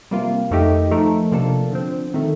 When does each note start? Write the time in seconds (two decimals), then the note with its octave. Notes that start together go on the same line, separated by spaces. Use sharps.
0.11 C3 G3 A#3 F4
0.51 F2 D#3 A3 D#4 G4
0.91 F3 A3 D#4 A#4
1.32 C3 F3 A#3 D4 A4
1.71 D3 F3 C4
2.14 D#3 A3